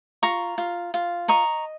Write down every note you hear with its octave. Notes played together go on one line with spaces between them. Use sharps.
F4 A#5 C#6
F4
F4
D#5 A#5 C#6